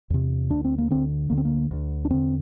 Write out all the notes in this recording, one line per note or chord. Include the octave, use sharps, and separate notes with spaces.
E2 C3
D2 D3 D4
C4
A#3
D2 D3 C4
D2 D3 A#3
C4
A#3
D2 D3
D4
E2 D3 C4